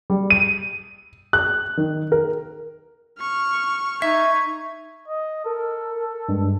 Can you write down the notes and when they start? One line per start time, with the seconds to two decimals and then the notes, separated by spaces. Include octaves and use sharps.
0.10 G3
0.30 D#7
1.33 F#6
1.77 D#3
2.12 A#4
3.19 C#6 F6
4.02 D#4 E5 C#6 G#6
5.08 D#5
5.46 A4 A#4
6.29 G2 G#3